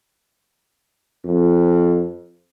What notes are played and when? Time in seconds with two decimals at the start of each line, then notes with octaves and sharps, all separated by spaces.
1.25 F2